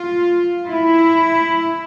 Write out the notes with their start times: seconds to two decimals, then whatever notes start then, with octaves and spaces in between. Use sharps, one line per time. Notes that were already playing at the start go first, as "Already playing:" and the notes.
Already playing: F4
0.68 E4